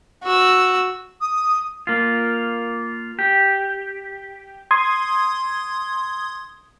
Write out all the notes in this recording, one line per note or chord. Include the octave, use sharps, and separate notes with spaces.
F#4 E6
D#6
A#3 F4
G4
C6 D#6 G#6